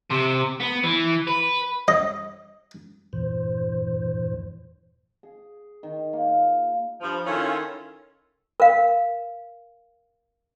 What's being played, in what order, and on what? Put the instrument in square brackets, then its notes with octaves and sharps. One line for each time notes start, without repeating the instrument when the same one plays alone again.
[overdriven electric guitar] C3
B3
E3
B4
[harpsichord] D#5
[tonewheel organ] E2 G2 A#2 E3 C5
[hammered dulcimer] G#4
D#3
A#3
F4
[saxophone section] G2 F3
[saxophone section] D#3 E4 A4 [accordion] C#4 F4 C#5
[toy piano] A#4 F5